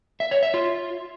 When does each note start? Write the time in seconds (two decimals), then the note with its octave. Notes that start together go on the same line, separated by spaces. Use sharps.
0.20 E5
0.31 C#5
0.43 E5
0.54 F4